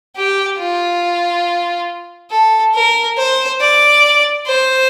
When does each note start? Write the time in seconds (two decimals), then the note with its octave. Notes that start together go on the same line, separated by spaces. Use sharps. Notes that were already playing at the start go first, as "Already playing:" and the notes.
0.16 G4
0.59 F4
2.31 A4
2.75 A#4
3.18 C5
3.61 D5
4.47 C5